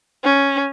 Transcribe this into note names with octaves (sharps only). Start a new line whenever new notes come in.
C#4